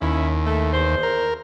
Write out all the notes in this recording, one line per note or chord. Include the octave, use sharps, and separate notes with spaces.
D#2 C#4 E4
A3
E2 C5
A#4